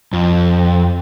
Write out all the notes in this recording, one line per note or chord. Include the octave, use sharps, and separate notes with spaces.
F2